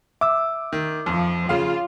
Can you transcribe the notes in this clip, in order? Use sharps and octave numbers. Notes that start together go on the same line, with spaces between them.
E5 D6 E6
D#3
F2 F3
C#3 F4 F5